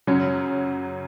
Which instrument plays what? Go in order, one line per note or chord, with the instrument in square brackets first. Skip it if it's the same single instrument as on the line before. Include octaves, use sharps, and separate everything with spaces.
[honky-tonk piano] F#2 C#3 F#3 C#4